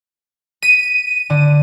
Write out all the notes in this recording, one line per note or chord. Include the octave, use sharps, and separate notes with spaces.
B6 D#7
D3